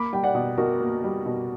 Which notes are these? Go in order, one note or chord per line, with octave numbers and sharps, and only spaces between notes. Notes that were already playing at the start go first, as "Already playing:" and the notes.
Already playing: A#3 B5 D6
G3 G5
D5 F#5
B2
B2 F#4 A#4
A#3
G3
B2